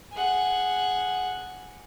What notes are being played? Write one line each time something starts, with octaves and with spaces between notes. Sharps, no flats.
G#4 F#5